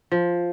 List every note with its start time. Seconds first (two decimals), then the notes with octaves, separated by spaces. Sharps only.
0.12 F3